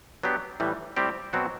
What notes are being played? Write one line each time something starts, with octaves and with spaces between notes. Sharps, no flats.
F#3 B3 D4 G4
A2 E3 G3
A2 G3 C4 G4 D5
B2 F#3 C4 F#4